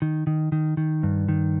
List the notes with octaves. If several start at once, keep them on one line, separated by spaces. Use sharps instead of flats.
D#3
D#3
D#3
D#3
G2
D#3